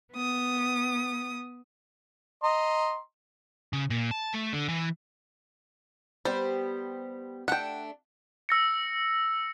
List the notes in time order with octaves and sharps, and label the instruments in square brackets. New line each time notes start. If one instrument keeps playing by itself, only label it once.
[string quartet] B3 D#6
[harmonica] D#5 A#5 C6
[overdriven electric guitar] C#3
A#2
A5
A3
D3
E3
[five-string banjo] G3 [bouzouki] B3 G4 C5
[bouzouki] A3 D4 [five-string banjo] F#5 G5
[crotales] E6 A#6 C#7